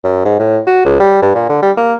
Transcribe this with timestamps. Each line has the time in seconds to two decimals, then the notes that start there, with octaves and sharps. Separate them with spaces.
0.04 F#2
0.25 G#2
0.39 A2
0.67 F#4
0.85 C#2
1.00 G3
1.22 G2
1.35 A#2
1.49 D3
1.62 G3
1.77 A#3